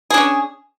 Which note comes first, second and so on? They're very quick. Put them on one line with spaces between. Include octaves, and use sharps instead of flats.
G#4 D4 C#4